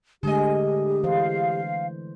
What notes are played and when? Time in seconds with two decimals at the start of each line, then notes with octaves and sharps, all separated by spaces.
0.23 D3 G#3 A3 G4 G#4 D#5
1.04 E3 C5 F5